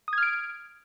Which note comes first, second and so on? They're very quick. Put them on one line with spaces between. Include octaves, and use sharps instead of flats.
D#6 G#6 F6 D7